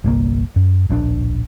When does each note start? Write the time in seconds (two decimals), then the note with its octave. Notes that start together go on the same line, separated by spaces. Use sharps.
0.04 G1 C2 A#3
0.56 F#2
0.89 D1 A#1 C4 D4